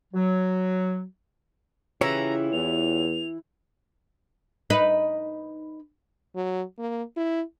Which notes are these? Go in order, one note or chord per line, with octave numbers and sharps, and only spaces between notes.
F#3
C#3 E3 E4 F4 G4 C#5 A#5
E2 F7
D#4 B4
F#3
A#3
E4